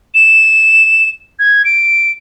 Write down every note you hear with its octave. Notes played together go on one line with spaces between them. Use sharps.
E7
G#6
D7